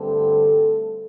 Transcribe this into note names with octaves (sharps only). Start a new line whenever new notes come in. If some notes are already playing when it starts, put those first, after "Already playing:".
Already playing: G2 D3 A3 C4 A4